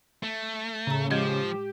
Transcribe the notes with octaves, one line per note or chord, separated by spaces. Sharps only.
A3
A2 C#3 A#5
F3 G#3 G4 D#5